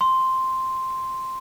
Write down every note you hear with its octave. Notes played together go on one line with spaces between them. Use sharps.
C6